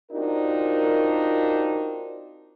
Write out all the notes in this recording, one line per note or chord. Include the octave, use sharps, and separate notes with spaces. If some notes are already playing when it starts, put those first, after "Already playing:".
C4 D4 D#4 F4 F#4 A#4